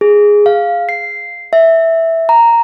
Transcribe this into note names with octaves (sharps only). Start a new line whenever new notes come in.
G#4
F5
C7
E5
A#5